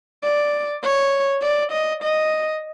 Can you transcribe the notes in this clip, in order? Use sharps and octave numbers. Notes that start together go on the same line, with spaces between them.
D5
C#5
D5
D#5
D#5